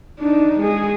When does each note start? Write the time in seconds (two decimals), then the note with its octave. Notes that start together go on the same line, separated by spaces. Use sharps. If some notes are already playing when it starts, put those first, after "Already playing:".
0.20 D4 D#4
0.60 G#3 G#4